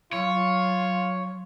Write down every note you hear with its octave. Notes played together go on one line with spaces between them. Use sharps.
F#3 F4 C#5